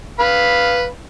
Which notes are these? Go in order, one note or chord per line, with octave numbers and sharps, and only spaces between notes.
B4 F5 B5